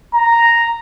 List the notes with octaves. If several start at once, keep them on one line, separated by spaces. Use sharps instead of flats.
A#5